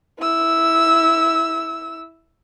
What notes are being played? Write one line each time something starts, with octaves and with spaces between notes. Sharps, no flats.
E4 E6